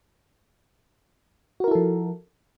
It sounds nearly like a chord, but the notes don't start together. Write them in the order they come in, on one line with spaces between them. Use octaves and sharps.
F#4 A#4 E4 A4 F3